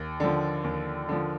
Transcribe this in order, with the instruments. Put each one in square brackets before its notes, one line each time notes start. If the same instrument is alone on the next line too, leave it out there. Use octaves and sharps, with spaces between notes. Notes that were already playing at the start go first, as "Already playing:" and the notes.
Already playing: [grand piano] D#2
D3 F3
D#2
D3 F3